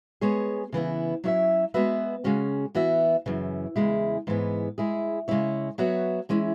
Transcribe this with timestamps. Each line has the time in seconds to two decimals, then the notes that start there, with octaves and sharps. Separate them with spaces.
0.21 G#3 B3 G#4 C#5
0.72 C#3 E3 B3 E4
1.24 F#3 C#4 E4 C#5 E5
1.74 G#3 B3 F#4 B4 E5
2.24 C#3 G#3 C#4 F#4
2.75 E3 B3 F#4 E5
3.26 F#2 C#3 E3
3.76 E2 C#3 G#3 E4
4.27 G#2 E3 G#3 B3
4.78 G#3 E4 G#4
5.28 C#3 G#3 E4 C#5
5.78 F#3 B3 F#4 C#5 E5
6.29 E3 G#3 C#4 E4